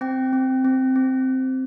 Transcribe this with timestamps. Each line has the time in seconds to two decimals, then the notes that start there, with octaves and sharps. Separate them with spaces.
0.01 C4 G5
0.33 C4
0.65 C4
0.96 C4